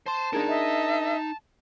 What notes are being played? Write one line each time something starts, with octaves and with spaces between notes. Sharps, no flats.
C5 A5 C6
D4 D#4 G#4 A#4
D#5 E5